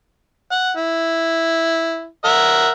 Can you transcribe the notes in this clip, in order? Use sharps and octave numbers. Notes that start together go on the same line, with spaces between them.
F#5
E4
A#4 E5 F#5